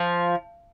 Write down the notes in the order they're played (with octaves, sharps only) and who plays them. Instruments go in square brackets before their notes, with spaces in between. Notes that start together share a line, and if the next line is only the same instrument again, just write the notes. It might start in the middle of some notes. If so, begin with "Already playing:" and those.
Already playing: [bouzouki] F3